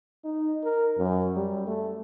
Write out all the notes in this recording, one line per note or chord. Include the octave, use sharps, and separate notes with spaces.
D#4
A#4
F#2
G3
A3